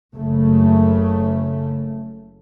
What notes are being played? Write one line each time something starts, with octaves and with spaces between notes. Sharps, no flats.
F#1 C#3 A3